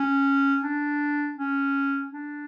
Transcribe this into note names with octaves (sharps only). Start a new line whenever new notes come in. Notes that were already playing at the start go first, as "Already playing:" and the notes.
Already playing: C#4
D4
C#4
D4